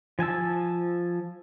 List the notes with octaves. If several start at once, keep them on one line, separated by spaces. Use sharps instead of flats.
F3 G#5 A5 E6